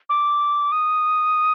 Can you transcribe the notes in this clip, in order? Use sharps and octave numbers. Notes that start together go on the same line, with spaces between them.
D6
D#6